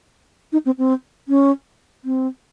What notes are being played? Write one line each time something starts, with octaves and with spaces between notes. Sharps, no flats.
D#4
C4
C4
C#4
C4